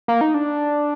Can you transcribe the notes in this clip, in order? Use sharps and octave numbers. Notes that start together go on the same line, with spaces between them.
A#3
D#4
D4